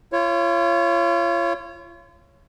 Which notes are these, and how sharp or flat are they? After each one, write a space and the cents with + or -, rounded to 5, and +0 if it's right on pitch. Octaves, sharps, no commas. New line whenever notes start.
F4 -40 C#5 -10